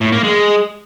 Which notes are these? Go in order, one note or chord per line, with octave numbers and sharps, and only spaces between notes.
A2
A#3
G#3